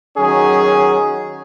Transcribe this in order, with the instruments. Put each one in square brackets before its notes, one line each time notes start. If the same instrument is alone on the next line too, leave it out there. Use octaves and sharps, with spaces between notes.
[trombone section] D#3 F#3 C#4 G#4